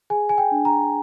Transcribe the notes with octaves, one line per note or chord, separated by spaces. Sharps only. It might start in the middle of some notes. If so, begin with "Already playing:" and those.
G#4 G#5
G#5
G5
D4
A#5